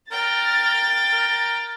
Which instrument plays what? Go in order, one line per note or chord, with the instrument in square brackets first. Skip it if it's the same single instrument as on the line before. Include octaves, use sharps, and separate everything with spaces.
[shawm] A#4 [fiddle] G5 [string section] A6
[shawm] A#4